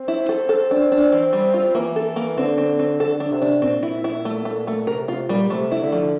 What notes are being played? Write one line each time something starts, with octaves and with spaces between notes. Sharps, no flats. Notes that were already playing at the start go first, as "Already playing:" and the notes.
Already playing: C4
E4
A4
A4
D4
D4
E3
G3
F4
E3 A#3
A4
A#3
D3 C4
C4
C4
D3 A4
D4
C3
D4
A#2 C4
E4
E4
A3
A3
A3
C3 A#4
C3 F4
A#2 G3
C3 A3
E4
D3
F3